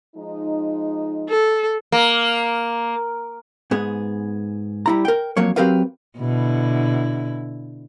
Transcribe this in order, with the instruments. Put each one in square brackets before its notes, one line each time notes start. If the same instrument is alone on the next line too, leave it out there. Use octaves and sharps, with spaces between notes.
[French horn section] F3 G#3 D#4
[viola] A4
[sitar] A#3
[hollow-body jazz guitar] G#2 B3 G#4
G3 E4 A#5
A#4 G5
F2 F#3 A#3 C#5
F#3 C4 G4 A#4 B4 F5
[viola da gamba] B2 D3 E4